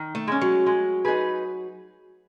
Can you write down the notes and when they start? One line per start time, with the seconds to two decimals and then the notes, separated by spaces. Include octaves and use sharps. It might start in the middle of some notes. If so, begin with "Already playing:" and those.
Already playing: D#3
0.15 A3
0.27 G#3 C#4
0.41 F#3
0.66 G#3
1.05 D#4 G#4 B4